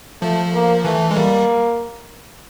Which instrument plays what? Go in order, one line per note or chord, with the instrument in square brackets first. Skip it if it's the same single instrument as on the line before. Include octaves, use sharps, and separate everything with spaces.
[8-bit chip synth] F3 [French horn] A3
[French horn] A#3
[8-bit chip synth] E3 [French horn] A3
[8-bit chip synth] G#3
[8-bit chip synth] G3 [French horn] A#3